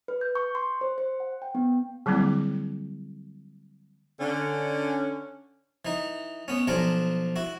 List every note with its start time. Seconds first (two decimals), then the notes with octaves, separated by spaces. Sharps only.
0.08 B4
0.21 G6
0.35 C#6
0.55 C6
0.81 C5
0.98 C5
1.20 F#5
1.42 G5
1.55 B3
2.06 D3 F#3 G3 A#3 C4 E4
4.21 D3 C#4
5.85 E3 D#4
6.48 B3 C#4
6.67 B1 F3 D4 F4 G#5 A#5
7.36 E4 F#4